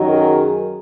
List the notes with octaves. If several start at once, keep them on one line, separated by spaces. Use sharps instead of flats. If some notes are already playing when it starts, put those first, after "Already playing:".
Already playing: F#2 D#3 F#3
G#4 A#4